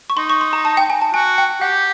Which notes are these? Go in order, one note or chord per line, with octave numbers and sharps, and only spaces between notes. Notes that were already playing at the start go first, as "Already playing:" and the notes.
C#6
D#4 C6
C#6
C6
A#5
A5
G5
G#5
A5
F#4 G#5
G5
G4 F#5